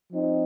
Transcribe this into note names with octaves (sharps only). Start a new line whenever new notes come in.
F3 C4 D#4